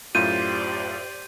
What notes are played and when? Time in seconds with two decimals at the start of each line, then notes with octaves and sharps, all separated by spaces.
0.15 F#2 A2 F4 G4 C5 D5 G6 D#7